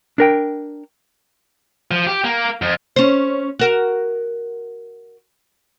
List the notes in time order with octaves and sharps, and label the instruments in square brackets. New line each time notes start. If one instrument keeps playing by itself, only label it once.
[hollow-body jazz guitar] D4 A#4 G5
[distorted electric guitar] F3
G4
A#3
F2
[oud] C#4 C5
F#4 A#4